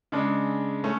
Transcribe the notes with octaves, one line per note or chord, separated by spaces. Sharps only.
C#3 G#3 D4
A3 C#4